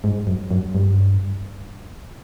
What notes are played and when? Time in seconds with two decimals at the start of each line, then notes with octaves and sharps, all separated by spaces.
0.04 G#2
0.27 F#2
0.51 F#2
0.75 G2